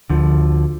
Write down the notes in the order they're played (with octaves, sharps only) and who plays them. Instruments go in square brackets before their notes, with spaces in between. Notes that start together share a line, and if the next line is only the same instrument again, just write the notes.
[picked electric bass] D2 D3 F3